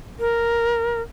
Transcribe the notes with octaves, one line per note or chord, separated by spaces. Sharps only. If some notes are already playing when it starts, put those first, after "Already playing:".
A#4